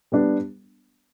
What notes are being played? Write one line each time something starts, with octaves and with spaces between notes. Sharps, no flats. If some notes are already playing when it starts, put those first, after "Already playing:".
G3 B3 D4